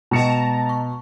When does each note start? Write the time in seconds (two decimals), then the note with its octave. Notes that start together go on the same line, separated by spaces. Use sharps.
0.11 B2 G#3 D#5 A5 A#5 C#7
0.69 C#6